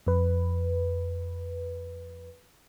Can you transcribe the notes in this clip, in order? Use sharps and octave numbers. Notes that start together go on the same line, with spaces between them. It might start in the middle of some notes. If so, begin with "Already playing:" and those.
F2 B4